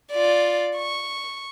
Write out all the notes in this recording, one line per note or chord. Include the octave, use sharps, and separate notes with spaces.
F4 D5
C#6